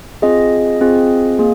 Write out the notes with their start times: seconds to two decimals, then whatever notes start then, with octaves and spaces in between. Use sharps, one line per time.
0.22 C4 F4 G#4 D#5
0.81 C4 F4 G#4
1.39 A#3 G#4